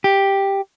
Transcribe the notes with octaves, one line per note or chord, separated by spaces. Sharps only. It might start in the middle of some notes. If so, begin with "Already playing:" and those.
G4